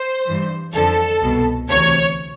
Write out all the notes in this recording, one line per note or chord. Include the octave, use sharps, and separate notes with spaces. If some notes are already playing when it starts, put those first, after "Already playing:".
Already playing: C5
G2 E3
F2 D3 F3 A4
C2 B2
D2 C3 E3 C#5